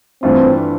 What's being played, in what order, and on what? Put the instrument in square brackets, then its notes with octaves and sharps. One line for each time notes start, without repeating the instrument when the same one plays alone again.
[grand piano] G2 E3 A3 D4 F4 [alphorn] C4